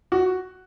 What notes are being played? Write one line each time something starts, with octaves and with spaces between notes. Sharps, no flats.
F#4